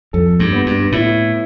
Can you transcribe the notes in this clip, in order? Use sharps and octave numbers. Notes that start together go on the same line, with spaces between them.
F2 A4
G2
B3
G2
A2 E4